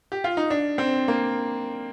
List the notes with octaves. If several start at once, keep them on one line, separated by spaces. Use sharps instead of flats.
G4
F4
D#4
D4
C4
A#3